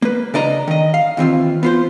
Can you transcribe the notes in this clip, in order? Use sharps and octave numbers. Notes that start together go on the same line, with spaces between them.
A#3 B4
C#3 D4 D5 D#5 A#5
D#3 D#5
F5
D#2 E3 C4 F4
B3 F4 C5